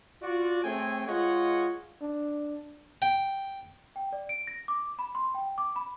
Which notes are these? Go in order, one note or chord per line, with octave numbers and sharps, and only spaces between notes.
F4 F#4 D5
A3 C4 G#4 C#5 G5 G#5
G#3 F4 C#5 D#5 F#5
D4
G5
G5
D5
D7
A#6
D6
B5
C6
G5
D6
B5